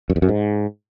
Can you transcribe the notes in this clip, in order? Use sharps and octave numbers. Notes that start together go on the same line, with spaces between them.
F#2
E2
F#2
G#2